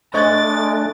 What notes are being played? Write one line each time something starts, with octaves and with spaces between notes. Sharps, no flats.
G#3 A3 D4 C5 D#5 C#6 A6